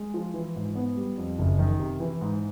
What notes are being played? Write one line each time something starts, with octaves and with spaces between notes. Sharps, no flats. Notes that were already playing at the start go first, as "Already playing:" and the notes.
Already playing: G#3
F3
E3
G#2
B3
G3
F2
F#1
D#3
C3
E3
G#2